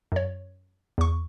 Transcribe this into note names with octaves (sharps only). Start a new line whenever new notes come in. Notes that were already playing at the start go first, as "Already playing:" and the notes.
F#2 C#5
E2 C#6